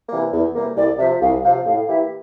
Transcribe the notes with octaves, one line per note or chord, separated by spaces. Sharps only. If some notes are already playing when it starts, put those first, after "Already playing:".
C3 E3 G3 A#3
E2
C3 E3 G3 A#3
C2 D5
C3 F3 E5
C2 F5
C3 F3 F5
A2 F5
E3 A#3 E4 G4 E5